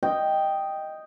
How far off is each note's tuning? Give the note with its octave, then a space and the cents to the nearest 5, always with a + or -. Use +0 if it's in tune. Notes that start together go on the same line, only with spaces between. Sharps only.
D#5 +0 G5 +0